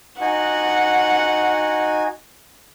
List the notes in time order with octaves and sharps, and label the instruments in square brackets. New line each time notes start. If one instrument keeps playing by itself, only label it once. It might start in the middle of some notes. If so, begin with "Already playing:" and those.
[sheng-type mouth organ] D#4 F#4 G#5 [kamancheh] F#5